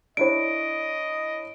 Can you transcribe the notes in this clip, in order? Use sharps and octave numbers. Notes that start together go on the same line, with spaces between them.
D4 E4 C#5 D#5 D7